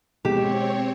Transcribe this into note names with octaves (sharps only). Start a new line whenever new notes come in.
B2 G#3 C4 G4 C#5 E7